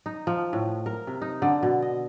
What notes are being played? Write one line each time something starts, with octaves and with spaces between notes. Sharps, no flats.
D#4
F3
A2
A#4
C3
D#4
D3
B2
D#5